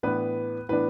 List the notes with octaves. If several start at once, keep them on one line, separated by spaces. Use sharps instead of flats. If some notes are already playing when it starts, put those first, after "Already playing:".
A2 E3 B3 D4 B4
A2 E3 B3 D4 B4